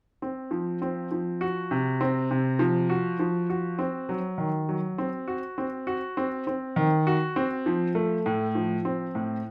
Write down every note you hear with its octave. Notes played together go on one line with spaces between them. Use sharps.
C4
F3
C4
F3
F#4
C3
C4
C3
F3
F#4
F3
F#4
C4
F#3
D#3
F#3
C4
F#4
C4
F#4
C4
C4
D#3
F#4
C4
F3
A3
A2
F3
C4
A2